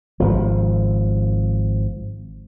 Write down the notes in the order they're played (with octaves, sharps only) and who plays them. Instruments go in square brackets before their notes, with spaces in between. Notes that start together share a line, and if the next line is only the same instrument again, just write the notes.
[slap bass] G#1 F3